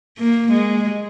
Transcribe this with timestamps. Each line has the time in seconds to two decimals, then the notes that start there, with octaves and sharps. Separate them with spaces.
0.19 A#3
0.52 G#3